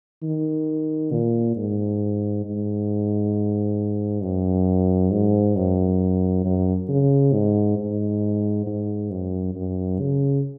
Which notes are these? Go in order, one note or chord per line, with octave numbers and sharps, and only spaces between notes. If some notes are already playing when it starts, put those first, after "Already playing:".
D#3
A#2
G#2
G#2
F#2
G#2
F#2
F#2
C#3
G#2
G#2
G#2
F#2
F#2
C#3